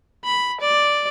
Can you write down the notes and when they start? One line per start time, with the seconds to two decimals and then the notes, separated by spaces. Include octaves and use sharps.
0.24 B5
0.60 D5